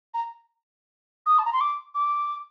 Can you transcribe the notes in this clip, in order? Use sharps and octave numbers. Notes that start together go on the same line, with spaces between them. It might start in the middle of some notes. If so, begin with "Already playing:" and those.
A#5
D#6
A5
A#5
C6
D6
D6